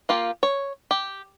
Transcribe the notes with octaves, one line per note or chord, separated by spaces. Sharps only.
A#3 F4 G4
C#5
G4